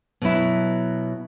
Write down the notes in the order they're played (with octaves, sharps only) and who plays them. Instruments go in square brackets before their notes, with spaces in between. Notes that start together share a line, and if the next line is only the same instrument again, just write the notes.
[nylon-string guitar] B2 F#3 E4